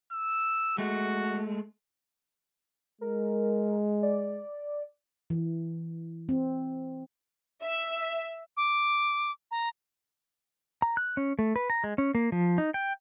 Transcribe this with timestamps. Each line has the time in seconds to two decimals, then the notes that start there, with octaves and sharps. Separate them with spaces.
0.12 E6
0.78 G#3 A3 F#4
3.01 G#3 A#4
4.02 D5
5.30 E3
6.29 C4
7.63 E5
8.57 D6
9.51 A#5
10.82 A#5
10.97 F#6
11.17 C#4
11.39 A3
11.56 B4
11.70 A#5
11.84 G#3
11.98 C#4
12.15 A#3
12.32 F3
12.58 D#4
12.74 G5